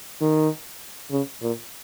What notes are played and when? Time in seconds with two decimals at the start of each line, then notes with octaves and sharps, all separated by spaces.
0.21 D#3
1.11 C#3
1.42 A#2